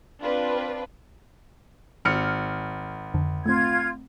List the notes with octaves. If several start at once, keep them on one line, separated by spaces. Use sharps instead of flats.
C4 D4 F4 B4
G#1 F6 C#7
F2 D3
A3 C4 F4 G#6